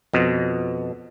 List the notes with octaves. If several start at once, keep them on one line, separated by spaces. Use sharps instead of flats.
F2 B2